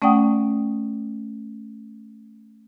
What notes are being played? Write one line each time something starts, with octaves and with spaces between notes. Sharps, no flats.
A3 C#4 D5 F#5 G5 D#6